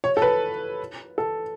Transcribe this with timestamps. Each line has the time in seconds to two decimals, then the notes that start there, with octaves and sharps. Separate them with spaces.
0.04 C#5
0.17 A4
0.22 B4
1.18 A4